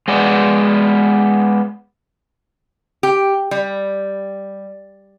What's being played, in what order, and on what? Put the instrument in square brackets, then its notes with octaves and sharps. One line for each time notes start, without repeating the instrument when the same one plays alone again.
[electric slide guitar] G#3 B3 D5
[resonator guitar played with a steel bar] G4
G3